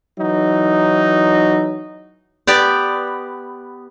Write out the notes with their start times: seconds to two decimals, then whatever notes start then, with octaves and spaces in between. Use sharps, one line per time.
0.18 E3 F#3 D#4
2.47 B3 G4 D5